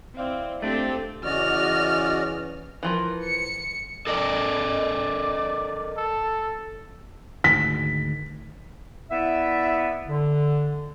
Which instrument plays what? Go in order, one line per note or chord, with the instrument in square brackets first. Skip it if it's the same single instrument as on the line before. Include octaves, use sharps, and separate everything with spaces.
[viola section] C4 [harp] E4 D5 F5
[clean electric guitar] A3 D4 [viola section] C4 G4 A4
[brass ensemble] C#3 E3 C#4 [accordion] F#4 D5 D#5 [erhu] F6
[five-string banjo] E3 F3 A#4
[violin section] C#7
[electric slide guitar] A4 A#4 D#5 [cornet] D5
[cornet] A4
[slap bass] D2 G#2 D#3 [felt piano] B6
[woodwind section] B3 E4 D5 E5
D3